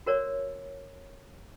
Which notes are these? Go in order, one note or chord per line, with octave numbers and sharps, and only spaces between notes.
F#4 A#4 C#5 D5